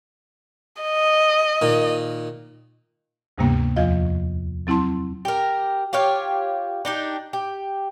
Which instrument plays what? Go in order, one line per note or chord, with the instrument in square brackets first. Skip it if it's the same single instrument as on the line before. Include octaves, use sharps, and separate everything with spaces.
[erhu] D#5
[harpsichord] A#2 D#3
[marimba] D2 G2 C3 G3 A#3 B3
E2 F3 F4 D#5 F5
F#3 C4 E4 A5 C6
[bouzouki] G4 A#4
F4 G4 C#5 F5
D4 D#4 G4
G4